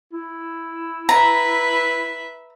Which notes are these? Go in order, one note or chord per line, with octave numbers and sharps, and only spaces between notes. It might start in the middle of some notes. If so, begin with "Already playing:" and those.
E4
B4 E5 A#5